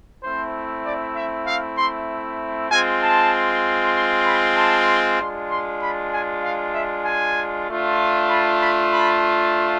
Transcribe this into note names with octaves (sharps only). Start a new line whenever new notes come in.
A3 C4 E4 C5
D5
E5
F5
C6
G#3 C4 F4 G#5
A5
C6
B5
A5
G#3 D4 F4 C6
C6
B5
G#5
F5
E5
G#5
A3 D4 F4
B5
B5
B5